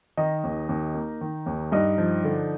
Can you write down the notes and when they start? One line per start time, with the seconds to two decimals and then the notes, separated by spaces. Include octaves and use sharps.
0.17 D#3 D#4 D#5
0.44 D#2
0.69 D#2
0.95 A#3
1.21 D#3
1.46 D#2
1.72 G2 D#4 D#5
1.98 F3
2.24 D3